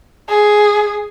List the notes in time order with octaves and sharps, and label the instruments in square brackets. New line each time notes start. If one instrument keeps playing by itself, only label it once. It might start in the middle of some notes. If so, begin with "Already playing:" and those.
[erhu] G#4